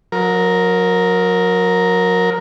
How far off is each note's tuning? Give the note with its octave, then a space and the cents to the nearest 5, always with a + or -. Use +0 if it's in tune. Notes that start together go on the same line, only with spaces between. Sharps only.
F#3 -35 A#4 +0